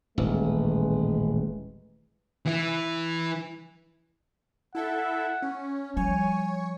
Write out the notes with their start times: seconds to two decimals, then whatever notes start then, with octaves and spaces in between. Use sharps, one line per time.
0.18 D#1 A1 G#3 B4
2.46 E3 E4
4.75 E4 A4 E5 F#5
5.42 C#4
5.97 F3 G3 C#5 G#5